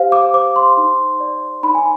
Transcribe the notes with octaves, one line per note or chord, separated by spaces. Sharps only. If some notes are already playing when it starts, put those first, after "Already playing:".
Already playing: G4 C5 F5
D6
C5 D6
C6
D#4
D5
D#4 B5
G#5